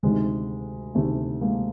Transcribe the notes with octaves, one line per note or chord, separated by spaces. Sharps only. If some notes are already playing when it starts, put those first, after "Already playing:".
D2 C3 D#3 G#3
D2 C3 D#3 A3
G#3 A#3